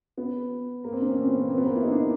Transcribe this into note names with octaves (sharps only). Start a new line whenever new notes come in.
B3
A#3
C4
D4
C#4
C4
B3
A#3
C4
B3
A#3
E4
D#4
D4
A#3